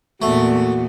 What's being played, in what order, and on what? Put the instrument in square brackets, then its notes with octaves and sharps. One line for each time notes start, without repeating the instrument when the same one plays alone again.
[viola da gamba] E2 A#2 [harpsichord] A3 [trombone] F#4